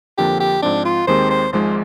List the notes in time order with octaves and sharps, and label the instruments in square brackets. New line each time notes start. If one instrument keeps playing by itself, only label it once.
[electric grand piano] F2 D3 F3 A#3 D4 [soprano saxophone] G4
[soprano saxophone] G4
[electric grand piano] G#2 F3 C4 [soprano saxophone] D4
[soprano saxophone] F4
[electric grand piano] D#2 D#3 G#3 C4 G4 [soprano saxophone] C5
[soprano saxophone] C5
[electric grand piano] G#1 G#2 F3 G#3 [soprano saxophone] C5